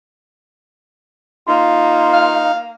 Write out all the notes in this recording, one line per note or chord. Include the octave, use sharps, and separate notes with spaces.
A#3 D#4 F4
F5